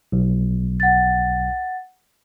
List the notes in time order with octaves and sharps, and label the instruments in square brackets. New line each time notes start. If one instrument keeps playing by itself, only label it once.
[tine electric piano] B1
[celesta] F#5 A6